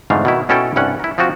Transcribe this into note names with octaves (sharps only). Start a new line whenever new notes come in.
F2 G#2 D3 E3 A3 F5
B2 D#3 E4
B2 C#4 E4 A4 C#5 G5
C2 G2 C#4 F#5
E4 A#4
F3 C4 F4 F#4